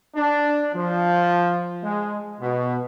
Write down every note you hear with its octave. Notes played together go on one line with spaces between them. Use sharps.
D4
F3
G#3
B2